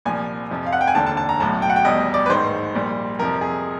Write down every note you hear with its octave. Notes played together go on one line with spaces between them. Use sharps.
C2 A#2 F3 G#5
F2 C3 F3
F5
F#5
G5
G#5
E1 D#2 D3 A5
A5
A5
A#5
B1 A2 F#3 A5
G5
F#5
G5
F1 E2 B2 G3 D#5
D#5
D5
B4
A1 G#2 D#3 C5
A#1 A#2 G3
F2 C3 F3 A#4
G#4